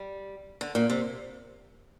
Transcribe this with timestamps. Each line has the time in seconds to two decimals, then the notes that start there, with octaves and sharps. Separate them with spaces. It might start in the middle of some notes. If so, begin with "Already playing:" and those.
Already playing: G3
0.61 D3
0.75 A#2
0.90 C3